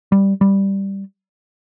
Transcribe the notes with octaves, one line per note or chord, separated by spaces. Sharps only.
G3
G3